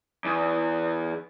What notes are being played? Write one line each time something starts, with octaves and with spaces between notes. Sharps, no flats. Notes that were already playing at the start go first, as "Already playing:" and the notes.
E2